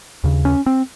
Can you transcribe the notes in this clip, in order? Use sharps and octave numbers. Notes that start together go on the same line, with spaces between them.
D#2 C#3
C#4
C4